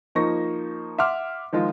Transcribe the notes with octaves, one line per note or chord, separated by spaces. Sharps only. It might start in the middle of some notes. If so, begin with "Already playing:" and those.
F3 A#3 D#4 C#6 A#6
E5 F#5 C6 D6 F6
D#3 F3 G#3 F4